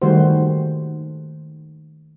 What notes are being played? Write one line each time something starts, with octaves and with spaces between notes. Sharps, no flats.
D#3 G3 A3 F#4 C5